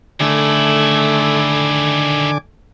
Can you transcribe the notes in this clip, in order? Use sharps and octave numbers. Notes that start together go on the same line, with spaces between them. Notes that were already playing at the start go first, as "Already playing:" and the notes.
D3 D#3 A3 E4 G#5 D6